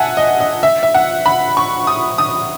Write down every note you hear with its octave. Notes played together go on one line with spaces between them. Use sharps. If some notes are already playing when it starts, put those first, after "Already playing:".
Already playing: E5 F#5 G#5 A5
D#5
D#5
E5
E5
F#5
B5
C#6
D#6
D#6